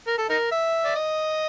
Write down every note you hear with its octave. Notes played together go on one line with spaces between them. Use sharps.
A#4
A4
D#4 A#4
E5
D5
D#5